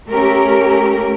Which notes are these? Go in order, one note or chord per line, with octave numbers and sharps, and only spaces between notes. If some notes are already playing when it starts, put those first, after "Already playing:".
A3 C#4 G4 A#4